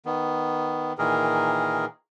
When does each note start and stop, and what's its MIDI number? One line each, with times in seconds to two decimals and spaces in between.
0.06 0.93 51
0.06 0.93 59
0.99 1.85 46
0.99 1.85 51
0.99 1.85 52
0.99 1.85 68
0.99 1.85 70